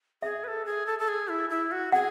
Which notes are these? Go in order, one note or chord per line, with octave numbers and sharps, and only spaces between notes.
G#4 E5
B4
A4
G#4
A4
A4
G#4
E4
E4
F#4
G#4 F#5